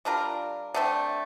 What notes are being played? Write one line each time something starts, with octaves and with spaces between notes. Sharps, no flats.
G3 D4 F4 A#4
D3 A3 C4